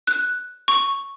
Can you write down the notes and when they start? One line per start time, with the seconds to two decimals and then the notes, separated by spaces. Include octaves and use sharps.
0.07 F#6
0.68 C#6